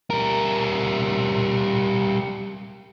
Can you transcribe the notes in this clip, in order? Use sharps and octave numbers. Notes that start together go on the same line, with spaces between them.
G3 A#4